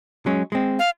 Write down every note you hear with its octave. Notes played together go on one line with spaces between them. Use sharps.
F#3 G#3 C#4
G#3 C4
F5